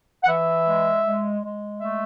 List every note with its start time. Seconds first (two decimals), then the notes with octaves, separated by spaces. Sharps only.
0.23 F#5
0.28 E3 E5
0.66 G#3
1.04 G#3
1.42 G#3
1.80 A3 E5